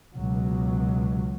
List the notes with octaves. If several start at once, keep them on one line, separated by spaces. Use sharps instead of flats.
C#2 B2 F#3